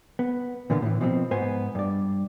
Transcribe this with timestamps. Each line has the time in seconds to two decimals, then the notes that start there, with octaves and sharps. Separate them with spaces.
0.19 B3
0.70 A#2 D3 E3 A#3 B3
0.82 A2 E3
1.01 B2 F3 C4
1.31 G#2 B3 C5 G#5
1.75 G2 D5